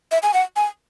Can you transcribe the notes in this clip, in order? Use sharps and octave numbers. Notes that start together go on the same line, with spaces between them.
E5
G#5
F#5
G#5